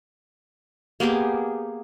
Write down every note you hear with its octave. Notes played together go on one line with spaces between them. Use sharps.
A#3 B3 G4 G#4